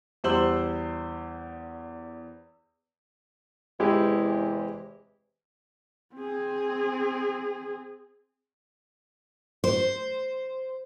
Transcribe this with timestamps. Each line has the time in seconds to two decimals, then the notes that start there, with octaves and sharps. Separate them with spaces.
0.24 E2 G3 C5 C6 E6 F#7
3.80 E2 C3 E3 G#3 E4 G4
6.15 C4 G#4
9.64 C5